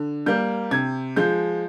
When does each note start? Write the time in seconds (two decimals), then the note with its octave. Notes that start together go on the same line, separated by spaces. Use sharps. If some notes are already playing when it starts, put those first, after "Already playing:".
Already playing: D3
0.26 G3 A#3 G6
0.71 C3 G#6
1.16 F3 G#3 G6